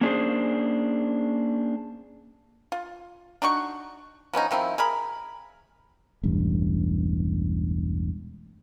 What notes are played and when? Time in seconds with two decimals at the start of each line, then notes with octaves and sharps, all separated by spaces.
0.01 A#3 C#4 D4 F#4 G#4 C5
2.72 F4
3.42 D4 D#4 F#4 C#6
4.33 F3 B3 C#4 D#4
4.51 D#3 F3 C4 E4
4.78 G#4 A#4 B5
6.23 E1 A1 G2